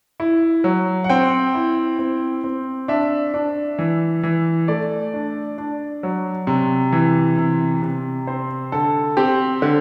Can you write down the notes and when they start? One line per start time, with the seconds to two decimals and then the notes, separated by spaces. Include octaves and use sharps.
0.20 E4
0.64 F#3
1.04 F#5
1.10 C4 G5
1.55 E4
1.99 C4
2.44 C4
2.88 D4 E5
3.34 D4
3.79 E3
4.23 E3
4.68 A3 D5
5.14 D4
5.58 D4
6.03 F#3
6.47 C3
6.92 E3
7.37 C3
7.82 C3
8.27 C4 C5
8.72 D3 A4
9.17 C4 G4
9.62 D3